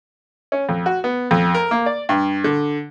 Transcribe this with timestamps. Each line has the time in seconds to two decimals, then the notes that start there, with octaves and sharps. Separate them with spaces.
0.52 C#4
0.69 F2
0.86 F#4
1.04 B3
1.31 F2
1.54 A#4
1.71 A#3
1.86 D5
2.09 G2
2.44 D3